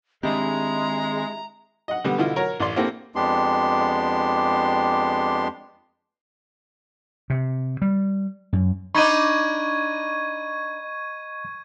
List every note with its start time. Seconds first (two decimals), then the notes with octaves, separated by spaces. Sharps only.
0.23 D#3 G#3 C4 D4 E4 G4 A#5
1.88 D#5 F#5
2.04 D3 G3 B3
2.18 B2 D3 E4 F4
2.36 F#3 A#4 C#5
2.60 A1 D5 C6
2.76 A#3 C4 E4 G4 A4
3.16 F2 G#3 B3 D4 G4 C6
7.30 C3
7.82 G3
8.53 F#2
8.95 D4 D#4 D#5 B5 C#6 G#6 D#7